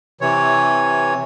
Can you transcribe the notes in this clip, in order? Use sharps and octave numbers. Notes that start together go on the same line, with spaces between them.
C3 E3 C#5